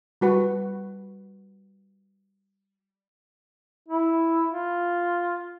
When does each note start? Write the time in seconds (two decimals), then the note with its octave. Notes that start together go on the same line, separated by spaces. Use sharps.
0.21 G3 F#4 B4
3.88 E4
4.51 F4